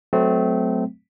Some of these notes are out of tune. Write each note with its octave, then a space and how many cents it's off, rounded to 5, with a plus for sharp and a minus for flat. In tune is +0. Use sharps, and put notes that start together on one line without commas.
F#3 +0 A3 -15 C4 -25